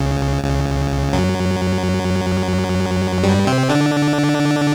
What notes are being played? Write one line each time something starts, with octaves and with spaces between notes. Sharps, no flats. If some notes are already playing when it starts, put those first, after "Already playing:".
Already playing: C#2 C#3
C#2 C#3
F#2 F#3
G2 G3
C3 C4
D3 D4